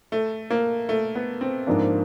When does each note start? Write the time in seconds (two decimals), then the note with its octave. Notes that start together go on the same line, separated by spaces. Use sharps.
0.12 A3
0.50 A#3
0.89 A3
1.15 B3
1.41 C4
1.67 G#2 F3 A#3 D4